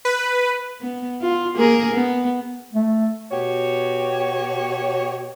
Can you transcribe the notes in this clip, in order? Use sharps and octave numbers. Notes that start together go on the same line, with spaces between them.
B4
B3
F4
A#3 G#4 A#4
B3
A3
B2 F#4 G4 C#5